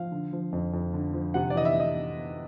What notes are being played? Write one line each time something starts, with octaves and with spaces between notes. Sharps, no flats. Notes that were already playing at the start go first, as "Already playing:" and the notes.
Already playing: F3 F5
D3
F3
F2
F2
D3
F3
C3 F#5
D5
E3 D#5
E5
D#5